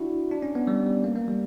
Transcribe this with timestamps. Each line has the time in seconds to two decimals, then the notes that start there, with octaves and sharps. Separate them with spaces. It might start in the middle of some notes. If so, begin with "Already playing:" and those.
Already playing: D4 E4 F#4
0.31 D4
0.42 C#4
0.55 B3
0.67 G3
0.86 G3
1.04 A#3
1.16 A#3
1.28 G3